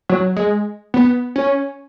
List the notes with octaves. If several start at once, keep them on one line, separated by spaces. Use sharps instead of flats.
F#3
G#3
B3
C#4